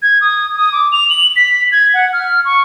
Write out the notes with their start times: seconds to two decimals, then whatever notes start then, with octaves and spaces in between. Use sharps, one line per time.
0.02 G#6
0.21 D#6
0.56 D#6
0.72 D6
0.92 F7
1.10 F#7
1.36 B6
1.72 G#6
1.94 F#5
2.13 F6
2.45 C#6